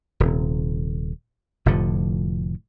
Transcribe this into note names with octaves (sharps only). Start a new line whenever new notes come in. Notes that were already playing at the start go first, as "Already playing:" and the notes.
D#1 C3
F1 A2 D3 F3